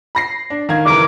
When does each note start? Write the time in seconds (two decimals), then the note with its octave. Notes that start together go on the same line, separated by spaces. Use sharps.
0.15 B5 A#6 C7
0.50 D4
0.69 D#3 F5 G#6
0.85 F#1 E3 A#4 D6